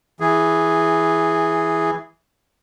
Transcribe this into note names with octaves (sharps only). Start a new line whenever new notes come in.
E3 G#4